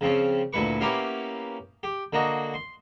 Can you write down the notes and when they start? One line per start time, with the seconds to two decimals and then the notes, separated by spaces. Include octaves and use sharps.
0.01 C#3 F3 C4 C#4
0.53 D2 A#2 E4 B4 C#6
0.81 A#3 B3 C#4 E4 G4 F5
1.83 G4
2.13 D3 A#3 F#4 D#5
2.54 C6